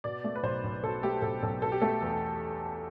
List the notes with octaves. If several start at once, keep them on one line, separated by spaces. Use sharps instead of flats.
B2 D5
A3
B4
B1 C5
B1
B2 A4
A3 G4
B1 A4
B1 A4
B2 A4
G4
A3 A4
E2